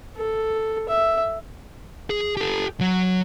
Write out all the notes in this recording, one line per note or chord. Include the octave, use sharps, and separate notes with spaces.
A4
E5
G#4
G4 A4
F#3